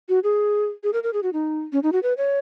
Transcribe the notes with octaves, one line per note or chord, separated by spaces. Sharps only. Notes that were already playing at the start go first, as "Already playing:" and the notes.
F#4
G#4
G#4
A#4
A#4
G#4
F#4
D#4
C#4
D#4
F#4
B4
C#5